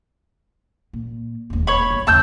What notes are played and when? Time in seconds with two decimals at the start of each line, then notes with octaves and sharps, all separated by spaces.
0.93 A#2
1.50 E1 D#2
1.67 C#5 B5
1.91 G1
2.07 F#1 E2 A5 E6 G6